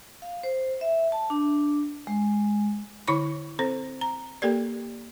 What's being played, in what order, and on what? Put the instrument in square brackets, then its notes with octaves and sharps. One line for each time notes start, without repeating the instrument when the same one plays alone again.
[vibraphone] F5
C5
E5
A5
D4
G#3
[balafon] D3 E4 C#5 B5 C#6
C4 A4 C5
A#5
A#3 G4 A4 A#4 D5